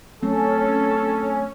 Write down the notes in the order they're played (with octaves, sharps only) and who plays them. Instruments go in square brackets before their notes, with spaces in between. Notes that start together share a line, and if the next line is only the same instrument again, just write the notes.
[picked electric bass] F#3 A3 C4 [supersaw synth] C#4 [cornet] A4